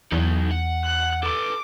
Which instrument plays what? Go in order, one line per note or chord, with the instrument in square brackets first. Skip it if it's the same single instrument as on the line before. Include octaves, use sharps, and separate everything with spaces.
[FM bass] E2 [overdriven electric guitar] F#3 D#4
[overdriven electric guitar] F#5
[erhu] F#6
[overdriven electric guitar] A4 B4 [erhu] D6